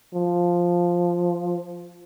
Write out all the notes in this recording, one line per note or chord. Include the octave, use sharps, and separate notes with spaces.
F3